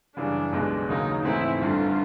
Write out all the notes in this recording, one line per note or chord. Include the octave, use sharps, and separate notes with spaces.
F#2 C#3 E3 G3 D4
B1 B2 G#3
D#2 C#3 F#3 A#3 D#4
G#2 E3 A3 C4 E4
G1 G2 D3 F4